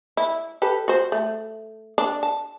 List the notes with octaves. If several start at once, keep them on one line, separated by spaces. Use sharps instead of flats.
E4
G4 A4 B4
F#4 C5
A3
D4
A5